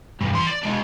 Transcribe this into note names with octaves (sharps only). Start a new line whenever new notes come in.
B1 G2
E3 C6
D5
G#3 D4